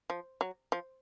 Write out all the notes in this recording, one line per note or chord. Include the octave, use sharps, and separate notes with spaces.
F3
F#3
F3